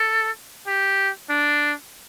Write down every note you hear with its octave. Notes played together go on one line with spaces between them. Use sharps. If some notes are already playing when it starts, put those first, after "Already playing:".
Already playing: A4
G4
D4